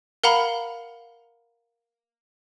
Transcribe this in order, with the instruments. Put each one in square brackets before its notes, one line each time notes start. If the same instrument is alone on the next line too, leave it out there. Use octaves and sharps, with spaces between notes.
[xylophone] A#4 F5 F#5 A#5 B5